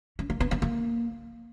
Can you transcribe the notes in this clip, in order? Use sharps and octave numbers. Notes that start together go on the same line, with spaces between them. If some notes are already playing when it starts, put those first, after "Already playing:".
C#4
A#3
B3
B3
A#3